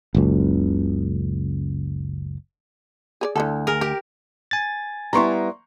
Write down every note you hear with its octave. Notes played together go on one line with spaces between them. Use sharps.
F#1 C#2
G#4 A#4 D5
D2 D3 E4 A4
G#4 A#4
G4 A#4
G#5 A6
G3 B3 E4 A#5 C6 C#6